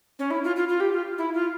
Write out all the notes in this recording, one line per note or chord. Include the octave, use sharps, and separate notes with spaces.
C#4
E4
F4
F4
F4
G4
F4
E4
F4